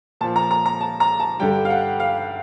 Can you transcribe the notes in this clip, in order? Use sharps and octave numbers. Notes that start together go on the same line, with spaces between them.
A#2 F3 A5
A#5
A#5
A#5
A5
A#5
A5
G2 D3 G3 G5
F5
F#5
F5